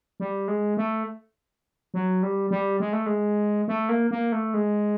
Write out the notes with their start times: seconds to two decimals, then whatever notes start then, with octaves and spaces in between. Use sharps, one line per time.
0.20 G3
0.48 G#3
0.77 A3
1.94 F#3
2.23 G3
2.51 G3
2.80 G#3
2.93 A3
3.06 G#3
3.68 A3
3.89 A#3
4.11 A#3
4.32 A3
4.54 G#3